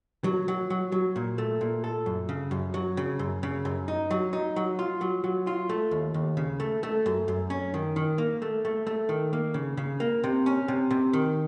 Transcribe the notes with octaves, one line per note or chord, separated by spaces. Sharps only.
F#3
F#3
F#3
F#3
A#2
A3
A#2
A4
F#2
C#3
F#2
F#3
C#3
F#2
C#3
F#2
D#4
F#3
D#4
F#3
F4
F#3
F#3
F4
A3
D#2
D#2
C#3
A3
A3
F#2
F#2
C#4
D#3
D#3
A#3
A3
A3
A3
D#3
A#3
C#3
C#3
A#3
C3
C#4
C3
C3
D#3